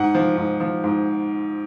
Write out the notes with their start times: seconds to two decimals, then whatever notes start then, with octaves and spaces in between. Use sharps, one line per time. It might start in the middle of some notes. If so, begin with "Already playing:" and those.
Already playing: G#2 F#5
0.15 F3
0.37 G#2
0.60 F3
0.84 G#2